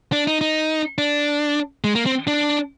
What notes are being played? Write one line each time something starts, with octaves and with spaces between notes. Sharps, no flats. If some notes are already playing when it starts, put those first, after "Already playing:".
D4
D#4
D#4
D4
G#3
A#3
C4
D4